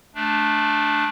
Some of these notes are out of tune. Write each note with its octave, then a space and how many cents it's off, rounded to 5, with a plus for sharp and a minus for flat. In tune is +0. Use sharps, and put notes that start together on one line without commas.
A3 -15 D4 +0